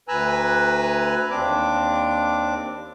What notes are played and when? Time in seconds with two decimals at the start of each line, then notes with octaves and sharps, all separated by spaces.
0.08 D2 B4 G#5 A#5 E6 F#6
1.31 D#2 C4 D4 D6